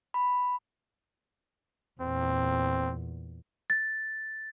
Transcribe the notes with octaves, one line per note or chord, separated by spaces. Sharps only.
B5
E2 A#2 C4
A6